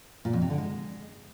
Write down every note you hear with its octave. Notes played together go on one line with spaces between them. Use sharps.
A#2
F2
C3
D3
G#3